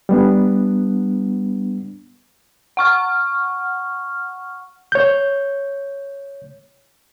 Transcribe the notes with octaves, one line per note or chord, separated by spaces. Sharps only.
G3 B3 D4
F#5 C#6 F6
C#5 G6